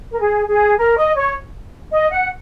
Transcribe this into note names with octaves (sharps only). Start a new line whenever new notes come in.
A#4
G#4
G#4
A#4
D#5
C#5
D#5
F#5